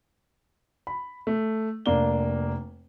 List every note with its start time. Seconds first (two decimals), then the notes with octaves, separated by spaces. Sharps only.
0.87 B5
1.27 A3
1.86 F1 A#3 D4 G7